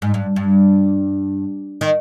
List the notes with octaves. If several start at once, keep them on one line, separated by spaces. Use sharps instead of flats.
G#2
G2
G2
D#3